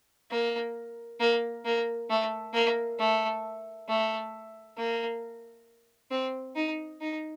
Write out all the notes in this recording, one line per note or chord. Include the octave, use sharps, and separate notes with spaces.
A#3
A#3
A#3
A3
A#3
A3
A3
A#3
C4
D#4
D#4